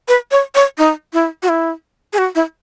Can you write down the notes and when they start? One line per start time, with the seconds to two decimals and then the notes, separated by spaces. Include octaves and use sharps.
0.08 B4
0.31 C#5
0.55 C#5
0.78 D#4
1.13 E4
1.42 F#4
1.49 E4
2.13 G#4
2.18 F#4
2.35 E4